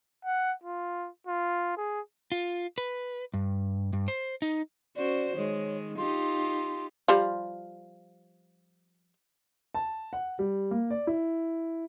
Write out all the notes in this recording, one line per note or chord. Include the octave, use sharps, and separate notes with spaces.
F#5
F4
F4
G#4
F4
B4
G2
G2
C5
D#4
C#4 F#4 C5 D5
D#3 G#3 C#5
D#4 F4 G4 C6
F3 G3 F4
A5
F#5
G3
A#3
D5
E4